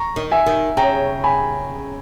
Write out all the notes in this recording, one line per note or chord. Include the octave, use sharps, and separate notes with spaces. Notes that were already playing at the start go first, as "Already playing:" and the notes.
Already playing: A#5 C#6
D#3
E5 G#5
D#3
C#3 G5 A#5
G#5 B5